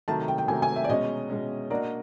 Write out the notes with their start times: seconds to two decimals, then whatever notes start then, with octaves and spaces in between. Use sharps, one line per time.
0.08 C3 D#3 F#3 A3 A5
0.28 G5
0.38 G5
0.48 C3 D#3 F#3 A3 G#5
0.62 G#5
0.76 E5
0.84 D5
0.89 B2 G#3 C#4 D#5
1.30 B2 G#3 C#4
1.70 A#3 D4 F#4 A#4 D5 D#5